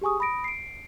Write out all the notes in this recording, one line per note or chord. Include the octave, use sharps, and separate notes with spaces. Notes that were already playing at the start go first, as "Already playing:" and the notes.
G4 G#4 G#5 C#6 D#6
B5 D#6 A#6 D7
C7 D7